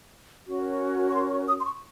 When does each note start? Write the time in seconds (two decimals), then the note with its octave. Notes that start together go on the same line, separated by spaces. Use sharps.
0.47 C#4 F#4 A#4 C#5
1.09 C#6
1.14 C6
1.30 C#6
1.47 D#6
1.60 C6
1.64 C#6